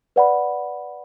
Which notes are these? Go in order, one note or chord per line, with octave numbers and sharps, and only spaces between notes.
B4 D5 F#5 B5